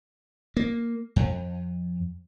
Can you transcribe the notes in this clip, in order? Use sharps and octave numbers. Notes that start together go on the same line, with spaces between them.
A#3
F2